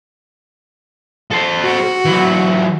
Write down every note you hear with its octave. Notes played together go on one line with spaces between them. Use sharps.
A4 C5
F#4
E3 F#3